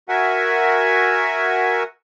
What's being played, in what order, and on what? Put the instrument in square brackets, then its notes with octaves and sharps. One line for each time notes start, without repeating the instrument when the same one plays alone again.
[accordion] F#4 A#4 E5 F#5 G#5